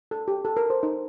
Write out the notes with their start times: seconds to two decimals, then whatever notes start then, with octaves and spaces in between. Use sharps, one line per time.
0.11 A4
0.28 G4
0.45 A4
0.57 A#4
0.70 C5
0.83 D#4